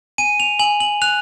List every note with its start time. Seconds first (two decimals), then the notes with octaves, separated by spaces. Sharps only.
0.18 G#5 D#7
0.40 F7
0.59 G#5 F#7
0.80 F#7
1.02 F#6 F7